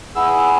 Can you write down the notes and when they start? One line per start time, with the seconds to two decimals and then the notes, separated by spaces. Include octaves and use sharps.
0.15 B3 E4 G#4 E6